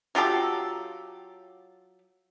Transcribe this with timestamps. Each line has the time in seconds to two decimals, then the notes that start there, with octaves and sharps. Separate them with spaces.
0.15 F#3 F4 G4 A4